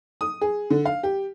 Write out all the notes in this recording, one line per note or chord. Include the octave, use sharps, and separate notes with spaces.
D#6
G#4
D3
F5
G4